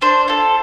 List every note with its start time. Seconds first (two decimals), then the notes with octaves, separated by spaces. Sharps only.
0.01 D4 C5
0.28 F4 A4